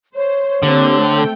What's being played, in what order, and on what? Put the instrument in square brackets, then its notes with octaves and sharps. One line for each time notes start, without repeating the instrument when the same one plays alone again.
[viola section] C5 [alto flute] C#5
[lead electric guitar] D3 [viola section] A#3 C4 G4
[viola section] A3 G5